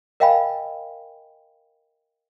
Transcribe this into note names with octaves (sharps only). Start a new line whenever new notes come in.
A#4 D#5 F5 G5 G#5 B5